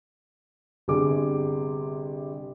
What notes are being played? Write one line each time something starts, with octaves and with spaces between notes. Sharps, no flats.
G1 C3 G#4 D6